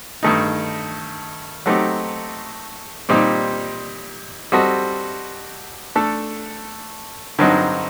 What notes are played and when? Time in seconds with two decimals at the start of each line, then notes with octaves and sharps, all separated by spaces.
0.23 G2 D#3 A3 D#4
1.66 F#3 A3 C4 D#4 G4
3.09 A#2 G3 C4 D#4 G4
4.52 G3 C4 F#4 A4 D#5
5.95 A3 D4 A4
7.39 G2 D3 F#3 C4 D#4